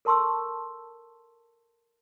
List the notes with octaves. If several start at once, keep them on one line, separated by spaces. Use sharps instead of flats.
A4 A#4 A5 C6 C#6 E6